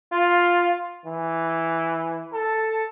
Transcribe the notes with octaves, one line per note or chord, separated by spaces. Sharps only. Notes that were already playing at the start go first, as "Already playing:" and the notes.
F4
E3
A4